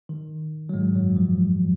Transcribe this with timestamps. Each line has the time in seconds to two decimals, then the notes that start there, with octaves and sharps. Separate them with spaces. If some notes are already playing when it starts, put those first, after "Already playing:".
0.09 D#3
0.69 F#3
0.74 G#2 G#3
0.95 F#2 F#3
1.17 F2 F3